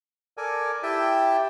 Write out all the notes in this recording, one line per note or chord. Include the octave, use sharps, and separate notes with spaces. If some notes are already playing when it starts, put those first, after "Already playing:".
A4 A#4 D5 G#5
E4 G4 E5 G5 A5